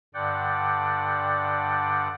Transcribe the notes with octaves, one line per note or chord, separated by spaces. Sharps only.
G2 D3 D5 F#5 G5